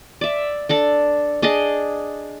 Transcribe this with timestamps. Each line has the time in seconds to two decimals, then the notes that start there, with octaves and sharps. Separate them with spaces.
0.21 D5 E5
0.69 D4 A4 D5
1.42 D4 G#4 D5 D#5